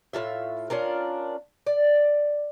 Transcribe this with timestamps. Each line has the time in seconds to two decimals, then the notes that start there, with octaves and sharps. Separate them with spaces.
0.13 A2 A#3 F4 E5
0.70 C#4 D4 F4 A#4
1.66 D5